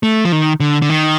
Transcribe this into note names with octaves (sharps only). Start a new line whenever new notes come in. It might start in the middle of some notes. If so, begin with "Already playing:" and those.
A3
F3
D#3
D3
D3
D#3